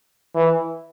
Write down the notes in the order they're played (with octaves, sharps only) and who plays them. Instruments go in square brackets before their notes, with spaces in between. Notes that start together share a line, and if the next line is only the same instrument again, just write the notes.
[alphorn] E3